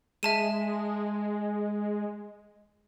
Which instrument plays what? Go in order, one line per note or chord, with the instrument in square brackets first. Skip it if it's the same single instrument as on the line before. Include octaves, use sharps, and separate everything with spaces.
[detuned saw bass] G#3 [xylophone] E5 A5 D#7